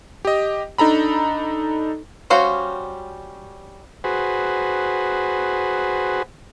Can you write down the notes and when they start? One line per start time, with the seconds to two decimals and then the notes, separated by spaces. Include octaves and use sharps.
0.25 G4 D#5
0.78 D4 D#4 A4 A#5 B5
2.30 G3 C#4 F#4 C5 F5
4.04 F#4 G#4 B4 C5